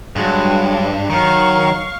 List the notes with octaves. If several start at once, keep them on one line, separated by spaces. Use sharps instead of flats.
G2 F#3 G#3 F#4
D4
D#3 F#3 F5 C#6